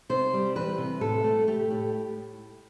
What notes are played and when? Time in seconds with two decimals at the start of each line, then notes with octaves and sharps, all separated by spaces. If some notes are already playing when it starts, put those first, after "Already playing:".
0.09 C3 C5
0.33 G3
0.56 E3 B4
0.78 C3
1.01 A2 A4
1.24 A3
1.48 A3 G4
1.71 A2